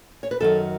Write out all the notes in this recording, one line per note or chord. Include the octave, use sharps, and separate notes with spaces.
C#5
B4
F#2 D#3 F#3 A4